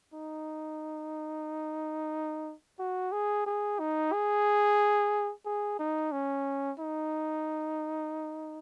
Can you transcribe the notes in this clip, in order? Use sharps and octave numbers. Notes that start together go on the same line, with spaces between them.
D#4
F#4
G#4
G#4
D#4
G#4
G#4
D#4
C#4
D#4